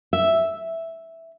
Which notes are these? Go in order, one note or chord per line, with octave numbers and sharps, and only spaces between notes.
E5